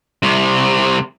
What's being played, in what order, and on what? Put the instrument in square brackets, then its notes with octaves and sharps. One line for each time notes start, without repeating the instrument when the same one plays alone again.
[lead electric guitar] C2 C3